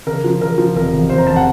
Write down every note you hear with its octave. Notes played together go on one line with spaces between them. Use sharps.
C#3 A#4
F3
C#3 A#4
F3
F1 A#4
F1
F1 C5
A#5
F1 A5
F#5